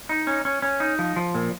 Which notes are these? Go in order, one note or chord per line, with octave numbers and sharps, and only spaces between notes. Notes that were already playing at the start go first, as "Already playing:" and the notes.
D#4
C#4
C#4
C#4
D#4
F3
F3
A#2